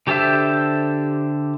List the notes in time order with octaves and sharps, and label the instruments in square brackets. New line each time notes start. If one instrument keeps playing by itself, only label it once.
[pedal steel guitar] D3 G4 A4 C5 E5